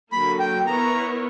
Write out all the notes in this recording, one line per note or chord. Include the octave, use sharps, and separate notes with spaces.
D3 F#3 A#3 B5
G5
B3 E4 A#4 C#5 A#5